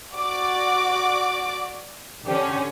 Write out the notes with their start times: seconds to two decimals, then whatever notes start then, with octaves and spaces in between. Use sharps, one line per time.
0.16 F#4 D5 D6
2.26 D3 C#4 G4